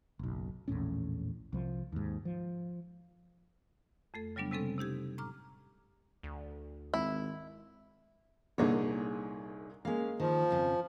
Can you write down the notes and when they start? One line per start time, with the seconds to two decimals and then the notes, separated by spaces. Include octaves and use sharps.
0.19 F#1 B1
0.68 A#1 E2 A2 C#4
1.53 C2 F3
1.92 D#2 G#2
2.25 F3
4.14 F2 A3 A4
4.36 C#3 F#3 G3 B3 D4
4.51 C3 G3 G#3 C4 C#4 A4
4.78 C3 D#4 G4 G#6
5.18 A2 A#5 D6 F6
6.23 D2
6.94 G#1 E4
8.58 C2 A#2 D3 D#4 G#4 C#5
9.85 G#3 A#3 C#4 F5
10.20 D#3 F3
10.50 F2 C#3